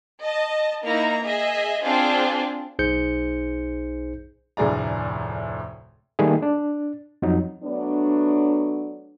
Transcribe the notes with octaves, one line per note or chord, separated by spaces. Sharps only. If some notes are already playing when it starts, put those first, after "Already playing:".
D#5 A5
A#3 D#4 E4 A#5
G#4 D#5 E5
C4 D4 F4 G#4 C5
B1 D#4 G#4 C5 G6 C#7
F1 D2 A2 G#4 D5 A#5
D#3 G3 A3 A#3 G#4
D4
F2 F#3 D#4
F#3 A3 B3 D4